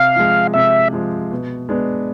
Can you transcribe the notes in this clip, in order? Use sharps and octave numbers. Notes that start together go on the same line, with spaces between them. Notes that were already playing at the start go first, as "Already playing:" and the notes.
Already playing: C3 F5
F3 G#3
C3 E5
F3 G#3
B2
G#3 B3 D4